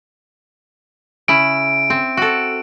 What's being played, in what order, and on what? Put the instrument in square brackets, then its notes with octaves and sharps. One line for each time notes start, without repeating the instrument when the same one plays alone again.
[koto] C#3 E4 [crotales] D7
[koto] C4
F#4 A4